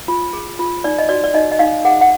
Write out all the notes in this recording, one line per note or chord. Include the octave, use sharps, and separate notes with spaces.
F4
G#4
F4
D#4 D5
D#5
F#4 D5
D5
D#4 D#5
D#5
D#4 F5
G#4 F#5
F#5